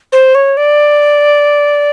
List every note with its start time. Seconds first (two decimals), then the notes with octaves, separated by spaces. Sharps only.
0.12 C5
0.35 C#5
0.57 D5